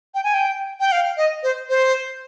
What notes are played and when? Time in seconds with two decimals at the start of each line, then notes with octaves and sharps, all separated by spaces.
0.15 G5
0.24 G#5
0.34 G5
0.80 G5
0.92 F5
1.17 D#5
1.43 C5
1.69 C5